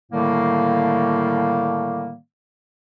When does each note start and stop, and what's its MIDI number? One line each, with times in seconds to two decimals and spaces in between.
0.12 2.14 45
0.12 2.14 50
0.12 2.14 51
0.12 2.14 55
0.12 2.14 57
0.12 2.14 58